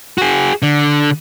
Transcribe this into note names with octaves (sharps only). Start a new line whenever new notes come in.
F#4 G#4
D3